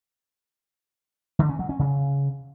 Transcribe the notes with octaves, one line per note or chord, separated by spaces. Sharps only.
D3
C#4
F#3
C#4
C#3